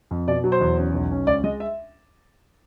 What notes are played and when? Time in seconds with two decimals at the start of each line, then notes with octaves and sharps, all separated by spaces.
0.11 F2
0.27 B2 D5
0.44 F#3
0.52 C5
0.61 E2
0.77 C#4
0.94 B1
1.11 C#4
1.27 C#2 D5
1.44 G#3 D#5
1.60 E5